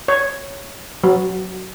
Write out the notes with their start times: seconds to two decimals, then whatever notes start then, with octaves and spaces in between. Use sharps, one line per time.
0.08 C#5
1.04 F#3